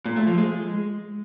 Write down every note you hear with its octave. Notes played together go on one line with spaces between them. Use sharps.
A#2
A3
F3
G#3